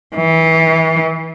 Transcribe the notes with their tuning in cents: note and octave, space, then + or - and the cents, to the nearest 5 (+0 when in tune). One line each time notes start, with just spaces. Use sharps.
E3 -25